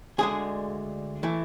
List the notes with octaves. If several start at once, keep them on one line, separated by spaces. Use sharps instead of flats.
D2 D3 G#3 G#4
E3 A3